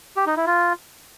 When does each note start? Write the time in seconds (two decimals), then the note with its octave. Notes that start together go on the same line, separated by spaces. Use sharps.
0.17 G4
0.27 D#4
0.37 E4
0.46 F4